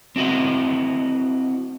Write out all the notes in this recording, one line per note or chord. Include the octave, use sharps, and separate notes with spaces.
C4 E4 F#4 D#5 G5